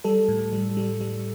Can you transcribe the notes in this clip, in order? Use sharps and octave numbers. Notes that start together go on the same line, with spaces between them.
G3 A4
A2
G3
G3
G3